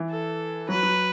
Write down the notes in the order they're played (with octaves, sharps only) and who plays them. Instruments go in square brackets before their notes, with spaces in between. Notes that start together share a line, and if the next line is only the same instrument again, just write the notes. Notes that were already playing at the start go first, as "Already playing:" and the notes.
Already playing: [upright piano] E3
[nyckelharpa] A4
[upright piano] F#3 [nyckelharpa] B4
[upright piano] F#3